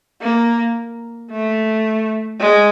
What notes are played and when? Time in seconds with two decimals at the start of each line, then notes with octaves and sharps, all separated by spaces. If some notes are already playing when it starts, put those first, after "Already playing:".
0.22 A#3
1.31 A3
2.40 G#3